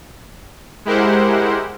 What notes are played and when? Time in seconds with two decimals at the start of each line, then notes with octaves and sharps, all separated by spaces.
0.85 G#3 E4 G4 A#4 C5 F#5